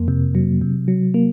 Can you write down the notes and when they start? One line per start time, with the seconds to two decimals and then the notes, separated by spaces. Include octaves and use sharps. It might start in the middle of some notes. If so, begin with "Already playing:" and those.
Already playing: F2 A#3
0.08 C3
0.35 F#3
0.61 C3
0.88 F#3
1.14 A#3